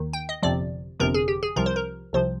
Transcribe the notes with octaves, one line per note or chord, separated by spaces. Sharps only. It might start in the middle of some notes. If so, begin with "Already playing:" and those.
Already playing: D#2 D#3
G5
D#5
G1 F2 C3 F3 D5
G1 F2 C3 F3 A#4
G#4
G4
G#4
C2 C3 F3 A#4
C5
A#4
C2 C3 F3 C5